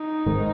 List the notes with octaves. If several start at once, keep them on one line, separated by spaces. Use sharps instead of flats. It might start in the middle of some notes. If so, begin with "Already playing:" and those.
Already playing: D#4
G#1 G#2 D#3